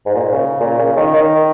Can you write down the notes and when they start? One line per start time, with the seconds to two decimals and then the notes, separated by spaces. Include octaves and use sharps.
0.06 G#2
0.15 A#2
0.24 G#2
0.33 C#3
0.60 A#2
0.78 C#3
0.96 D#3
1.14 D#3